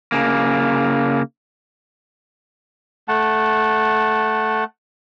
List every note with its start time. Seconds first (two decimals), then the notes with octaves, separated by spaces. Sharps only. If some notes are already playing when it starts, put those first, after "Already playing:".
0.12 C#3 A#3
3.08 A3 F#5 A5